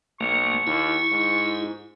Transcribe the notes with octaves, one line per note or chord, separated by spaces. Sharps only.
B1 A#3 C#6
D#2 E4
G#2